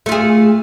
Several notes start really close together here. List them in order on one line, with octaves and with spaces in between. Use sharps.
A3 F4 G#4